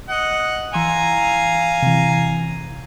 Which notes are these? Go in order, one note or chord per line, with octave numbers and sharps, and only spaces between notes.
D#5 F#5
E3 F5 G#5 A#5 C6 E6
C3 E3